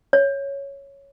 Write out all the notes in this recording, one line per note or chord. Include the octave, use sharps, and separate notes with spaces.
C#5